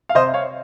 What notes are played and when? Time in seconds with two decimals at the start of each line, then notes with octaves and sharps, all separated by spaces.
0.09 F5
0.15 C3 C5 D#5
0.34 C#5 F5